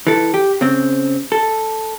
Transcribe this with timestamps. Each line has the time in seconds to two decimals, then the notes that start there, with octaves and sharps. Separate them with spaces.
0.07 E3 A4
0.34 G4
0.61 C#3 C4
1.32 A4